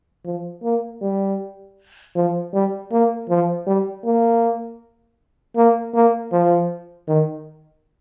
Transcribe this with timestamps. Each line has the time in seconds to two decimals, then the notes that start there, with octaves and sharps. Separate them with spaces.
0.25 F3
0.63 A#3
1.02 G3
2.15 F3
2.53 G3
2.91 A#3
3.29 F3
3.67 G3
4.05 A#3
5.56 A#3
5.94 A#3
6.32 F3
7.08 D#3